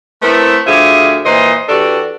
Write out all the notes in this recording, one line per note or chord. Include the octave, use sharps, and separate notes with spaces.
A3 B3 C4 E4 A#4
D2 F3 G4 G#4 E5
A#2 E3 C5 D#5
E3 D4 F#4 G4 A4